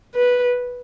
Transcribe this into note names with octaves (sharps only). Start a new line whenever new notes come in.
B4